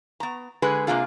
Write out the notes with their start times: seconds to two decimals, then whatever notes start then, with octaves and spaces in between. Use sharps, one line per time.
0.20 B3 A#5
0.62 D3 G#3 G#4 B4
0.87 C3 D#3 A#3 D4 F4 G#4